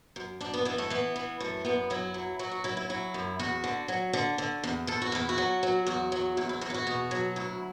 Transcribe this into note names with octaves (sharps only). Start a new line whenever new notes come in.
F#2
F#2 D4
B3
E3 B3
A3
E3 B3
E3
F#2 A3
F#2 B3
F#3 E4
F#3
F#3 F#4
F#4
F#3 E4
E4
F#3 E4
F#2
E2 F#4
D3
F#3
D3
D3
E2
E2 A4
F#4
E2 E4
F#4
F#3
F#3
E2 F#4
F#3
E2 E4
E4
E2 F#4
E4
F#4
B2
F#3
D2 E4